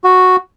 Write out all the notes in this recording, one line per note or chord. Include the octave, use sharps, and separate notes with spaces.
F#4